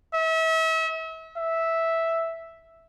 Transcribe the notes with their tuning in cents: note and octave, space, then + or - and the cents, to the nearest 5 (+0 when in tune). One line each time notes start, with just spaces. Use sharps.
E5 -35
E5 -5